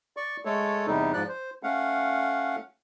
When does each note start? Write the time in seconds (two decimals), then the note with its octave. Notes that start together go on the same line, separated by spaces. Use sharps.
0.17 D5 C#6
0.45 G#3 A3 A4 C#5
0.87 E2 C3 G3 D#4
1.13 G#2 F3 D5 F#6
1.29 C5
1.63 A3 C#4 F5 F#5